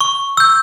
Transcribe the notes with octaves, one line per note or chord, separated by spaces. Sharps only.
C#6
E6 G6